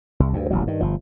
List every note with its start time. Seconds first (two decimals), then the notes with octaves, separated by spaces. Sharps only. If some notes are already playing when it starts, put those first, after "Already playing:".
0.20 C2
0.33 D2 G2
0.51 D#1 A1 F#3
0.67 G2 D#3
0.81 G1 F3